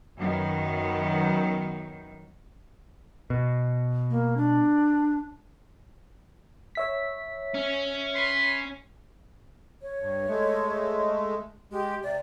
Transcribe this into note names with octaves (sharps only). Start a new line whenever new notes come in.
F#2 D#3 F#3 B3
B2
A#3
D4
C#5 E5 B6
C#4
B4 B5 C6
C#5
G2
G#3 A3
G#3 G4
C3 D5